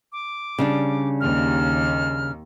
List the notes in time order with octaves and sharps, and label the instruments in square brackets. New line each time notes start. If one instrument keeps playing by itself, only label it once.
[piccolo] D6
[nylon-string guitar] C#3 G3 D4
[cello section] D#2 [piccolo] F6